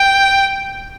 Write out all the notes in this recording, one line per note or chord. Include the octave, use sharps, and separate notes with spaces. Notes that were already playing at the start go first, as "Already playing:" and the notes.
Already playing: G5